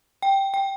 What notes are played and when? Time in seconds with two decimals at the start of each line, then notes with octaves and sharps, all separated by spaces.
0.22 G5
0.54 G5